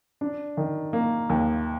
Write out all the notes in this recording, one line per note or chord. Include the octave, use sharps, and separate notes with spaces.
D4
D#3
A#3
D#2